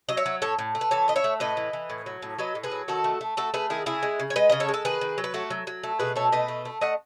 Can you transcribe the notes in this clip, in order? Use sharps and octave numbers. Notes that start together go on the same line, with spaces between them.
F#3 D#5
C#5 E5
F#3
A2 A4 C#5
A2
A3
B4
E3 A4 C#5
A3 D#5
C#5 E5
A3
A2 B4 D#5
E3
E3
A2
F#3
A2
F#3 B4 D#5
A2
G#4 B4
F#3
D#3 F#4 A4
A3
A3
A3 F#4 A4
A3 G#4 B4
D#3 E4 G#4
C#3 E4 G#4
G#3
C#3
C#5
G#3 B4 D#5
C#3 D#5
A4 C#5
G#3
A4
D#3 G#4 B4
D#3
F#3
B4
A3 F#4 A4
F#3
F#3
A3
B2 G#4 B4
A3 A4 C#5
B2 B4 D#5
A3
A3
A3 D#5 F#5